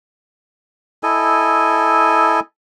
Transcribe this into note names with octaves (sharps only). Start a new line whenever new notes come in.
E4 A4 D#5 G#5